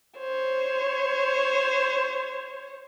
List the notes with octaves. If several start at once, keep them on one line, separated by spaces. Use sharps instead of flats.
C5 C#5